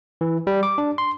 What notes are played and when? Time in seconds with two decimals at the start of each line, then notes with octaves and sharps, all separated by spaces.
0.21 E3
0.47 G3
0.63 D6
0.78 D4
0.98 C6